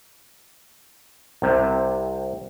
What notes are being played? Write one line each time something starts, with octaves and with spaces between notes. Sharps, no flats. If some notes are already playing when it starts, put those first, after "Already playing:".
C2 C3